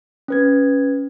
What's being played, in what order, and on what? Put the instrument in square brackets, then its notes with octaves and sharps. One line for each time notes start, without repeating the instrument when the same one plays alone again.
[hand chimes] C#4 B4 G#6